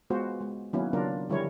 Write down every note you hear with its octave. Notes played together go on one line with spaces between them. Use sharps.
G#3 B3 F4 F#4 C5
G#3
D#3 F#3 A#3 B3 C#4 E4
C#3 F#3 A#3 D4 F4 A#4
D3 F3 G3 E4 A#4 C#5